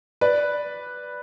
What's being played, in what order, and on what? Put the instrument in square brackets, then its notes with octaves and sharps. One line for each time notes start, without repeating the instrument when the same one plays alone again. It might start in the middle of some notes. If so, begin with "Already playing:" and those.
[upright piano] B4 D5